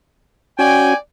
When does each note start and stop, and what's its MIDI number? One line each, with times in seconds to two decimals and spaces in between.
0.59 0.94 61
0.59 0.94 66
0.59 0.95 74
0.59 0.95 79
0.59 0.95 80